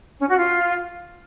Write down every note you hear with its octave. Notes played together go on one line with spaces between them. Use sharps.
C#4
F#4
F4